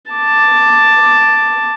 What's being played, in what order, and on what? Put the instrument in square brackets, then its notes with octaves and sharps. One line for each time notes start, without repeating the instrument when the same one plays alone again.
[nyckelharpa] A5 D6